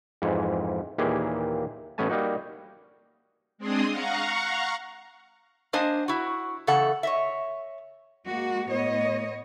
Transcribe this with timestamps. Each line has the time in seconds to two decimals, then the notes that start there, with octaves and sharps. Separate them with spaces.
0.22 F2 G#2 E3
0.98 D#2 A#2 E3 A#3 G4 G#4
1.98 A1 A2 B3 C#4 G#5 A5
2.10 G3 A#3 D#4 F#4
3.58 G#3 C4 D4 G#4 C5 D#6
3.90 F5 F#5 A#5 C#6
5.73 A#3 D4 C5 D#5 G#5
6.08 E4 F#4
6.67 C#3 E3 A3 A4 F#5
7.03 C#5 D#5 E5
8.27 G#3 A#3 F#4
8.69 A2 B3 C#5 D#5